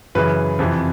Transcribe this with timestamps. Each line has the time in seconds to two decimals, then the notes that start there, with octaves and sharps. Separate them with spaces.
0.15 F#2 C#3 E3 B4
0.59 F2 C3 E3